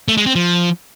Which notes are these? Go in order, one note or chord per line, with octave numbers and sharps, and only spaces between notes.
A3
G#3
C4
F3